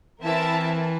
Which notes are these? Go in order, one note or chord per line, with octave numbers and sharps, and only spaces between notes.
E3 C4 E4 A#4 E5 A5